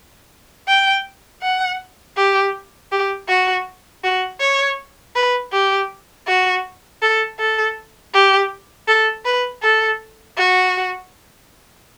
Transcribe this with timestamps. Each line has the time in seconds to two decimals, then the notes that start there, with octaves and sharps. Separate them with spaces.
0.68 G5
1.42 F#5
2.17 G4
2.92 G4
3.28 F#4
4.04 F#4
4.40 C#5
5.16 B4
5.52 G4
6.27 F#4
7.02 A4
7.39 A4
8.13 G4
8.88 A4
9.25 B4
9.62 A4
10.37 F#4